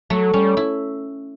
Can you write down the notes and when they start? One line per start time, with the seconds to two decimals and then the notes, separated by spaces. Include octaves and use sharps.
0.10 F#3 A3
0.33 G3 C#4
0.57 E4